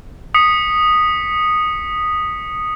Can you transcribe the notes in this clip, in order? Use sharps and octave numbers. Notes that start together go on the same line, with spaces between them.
D#6 B6 C#7